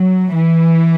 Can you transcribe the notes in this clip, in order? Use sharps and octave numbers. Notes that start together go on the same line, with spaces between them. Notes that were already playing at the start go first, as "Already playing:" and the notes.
Already playing: F#3
E3